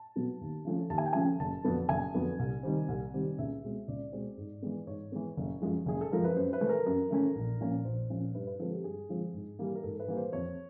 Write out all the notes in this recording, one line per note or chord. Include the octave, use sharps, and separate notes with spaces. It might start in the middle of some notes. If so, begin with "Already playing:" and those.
Already playing: A5
B2 F#3 B3
D#2
C#3 F3 A3 C#4
D#2 A5
G#5
G5
C#3 F3 A3 C#4 G#5
F#1 A5
F2 D3 F#3 B3
F#1 G#5
F2 D3 F#3 B3
C2
C3 D#3 G3 C4
C2
C3 D#3 G3 C4
C#2 E5
B2 G#3 C4
C#2 D5
B2 G#3 C4
G#2
E3 G#3 B3
G#2 C#5
E3 G#3 B3
F#1
F#2 C#3 F3 G#3
F#1 G#4
A4
F#2 C#3 F3 G#3 A#4
B4
F#2 C5
B4
C#3 E3 A3 C#4
A#4
F#2
C#3 E3 A3 C#4
A#1
A#2 F3 A#3 C#4
A#1 C5
A#2 F3 A#3 C#4
G2 B4
B4
D3 F3 G#3 C4 A4
G4
G2 G#4
D3 F3 G#3 C4
G#2
E3 G3 A#3
A#4
G#2 A4
B4
E3 G3 A#3
C5
F2 C#5